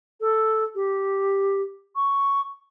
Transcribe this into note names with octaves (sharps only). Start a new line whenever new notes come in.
A4
G4
C#6